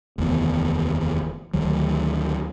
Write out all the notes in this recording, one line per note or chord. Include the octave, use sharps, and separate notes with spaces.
F1 D#2 E3 B3
D2 D#3 F#3